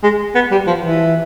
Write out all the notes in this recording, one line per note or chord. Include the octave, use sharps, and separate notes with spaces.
G#3
B3
G3
F3
E3